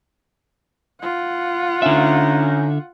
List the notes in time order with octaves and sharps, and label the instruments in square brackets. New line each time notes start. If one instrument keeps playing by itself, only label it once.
[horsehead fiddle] F4 F#5
[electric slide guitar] D3 E5 [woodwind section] C#4 D#4